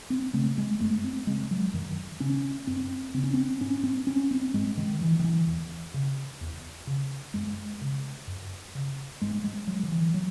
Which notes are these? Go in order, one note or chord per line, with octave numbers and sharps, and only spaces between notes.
C4
C#3 A3
G#3
F#2 A3
C4
C#3 G#3
F#3
F#2 D#3
C#3 C#4
F#2 C4
C#3 C4
C#4
C4
G#2 C#4
C4
C#4
C4
G#2 G#3
D#3
E3
D#3
E3
E2
C#3
E2
C#3
F#2 G#3
C#3
F#2
C#3
G#2 G#3
G#3
F#3
D#3
E3
F#3